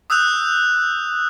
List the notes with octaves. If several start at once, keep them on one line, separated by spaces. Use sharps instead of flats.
D#6 E6 F#6 G6 F7